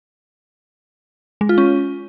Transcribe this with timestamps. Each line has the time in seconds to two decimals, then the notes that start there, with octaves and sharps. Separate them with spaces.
1.41 G#3
1.49 F4
1.58 C#4